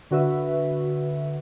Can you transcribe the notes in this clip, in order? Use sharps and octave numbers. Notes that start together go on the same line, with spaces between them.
D3 F#4 B4 E5